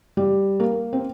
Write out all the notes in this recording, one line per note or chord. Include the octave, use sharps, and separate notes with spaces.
G3
A#3
C4